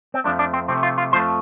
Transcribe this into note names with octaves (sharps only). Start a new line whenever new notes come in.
C4
F2 F3 A3 D4
D4
C4
C3 F3 A3 C4
F4
F4
F2 F3 A3 C5